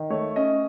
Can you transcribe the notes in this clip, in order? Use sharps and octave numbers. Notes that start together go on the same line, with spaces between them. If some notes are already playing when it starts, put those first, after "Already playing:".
Already playing: D#3
A3 C#5
C#4 D#5